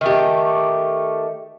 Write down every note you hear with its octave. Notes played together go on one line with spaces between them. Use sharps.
D#3 A3 G4